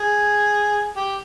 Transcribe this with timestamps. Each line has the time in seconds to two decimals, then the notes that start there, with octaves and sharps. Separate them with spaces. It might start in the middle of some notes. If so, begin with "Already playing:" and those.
Already playing: G#4
0.96 G4